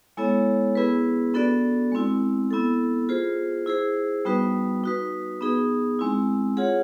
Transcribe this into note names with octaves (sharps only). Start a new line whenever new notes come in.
G#3 B3 E4 A4 C#5
B3 E4 G#4 B4
B3 D4 F#4 A4 D5
G#3 C4 E4
B3 E4 A4
F4 G#4 C5
E4 G#4 C5
G3 B3 D#4 F#4 B4
D#4 F#4 B4
B3 D#4 G#4
G#3 C4 E4
F4 G#4 C#5 F#5